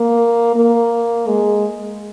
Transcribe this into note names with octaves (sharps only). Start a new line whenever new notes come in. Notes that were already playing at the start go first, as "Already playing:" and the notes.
Already playing: A#3
A#3
G#3